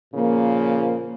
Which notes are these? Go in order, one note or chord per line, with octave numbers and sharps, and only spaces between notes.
A#2 C#3 F3 A#3